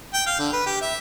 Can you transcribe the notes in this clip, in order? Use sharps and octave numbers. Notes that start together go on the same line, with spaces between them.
G5
F5
D3
B4
G4
E5